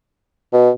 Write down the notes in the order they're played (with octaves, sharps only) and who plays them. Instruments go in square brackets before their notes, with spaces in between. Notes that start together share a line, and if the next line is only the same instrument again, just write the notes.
[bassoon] B2